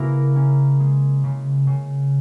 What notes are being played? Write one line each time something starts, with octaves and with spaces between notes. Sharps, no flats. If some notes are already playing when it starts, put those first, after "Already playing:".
Already playing: C#3 A#3 E4 F#4 A#4 E5
C#4
G#3
C#3
C#3